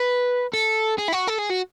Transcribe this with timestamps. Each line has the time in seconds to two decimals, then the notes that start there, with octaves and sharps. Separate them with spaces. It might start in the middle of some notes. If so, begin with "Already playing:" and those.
Already playing: B4
0.54 A4
0.98 G#4
1.08 E4
1.13 F#4
1.28 A4
1.39 G#4
1.50 F#4